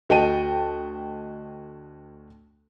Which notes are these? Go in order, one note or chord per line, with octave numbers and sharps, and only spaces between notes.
D2 F#4 D#5 G5 A5 D#7